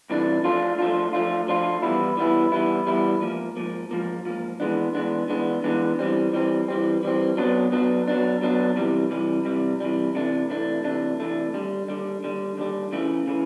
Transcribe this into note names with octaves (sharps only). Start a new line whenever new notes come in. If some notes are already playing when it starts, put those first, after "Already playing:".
C2 C3 E3 A3 D4
F3 A3 D4 F4
F3 A3 D4 F4
F3 A3 D4 F4
F3 A3 D4 F4
E3 G3 B3 E4
E3 G3 B3 E4
E3 G3 B3 E4
E3 G3 B3 E4
G#2 F3 A#3
G#2 F3 A#3
G#2 F3 A#3
G#2 F3 A#3
E3 G#3 B3 D4
E3 G#3 B3 D4
E3 G#3 B3 D4
E3 G#3 B3 D4
E3 G3 C4
E3 G3 C4
E3 G3 C4
E3 G3 C4
F#3 B3 D4
F#3 B3 D4
F#3 B3 D4
F#3 B3 D4
C3 E3 G3
C3 E3 G3
C3 E3 G3
C3 E3 G3
C3 E3 A3 D4
C3 E3 A3 D4
C3 E3 A3 D4
C3 E3 A3 D4
D#2 D3 G3
D#2 D3 G3
D#2 D3 G3
D#2 D3 G3
C#3 E3 A3
C#3 E3